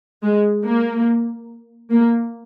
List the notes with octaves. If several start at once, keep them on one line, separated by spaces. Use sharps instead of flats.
G#3
A#3
A#3